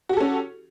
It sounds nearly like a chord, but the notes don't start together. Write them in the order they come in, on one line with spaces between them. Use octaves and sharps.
F#4 G4 A4 C#4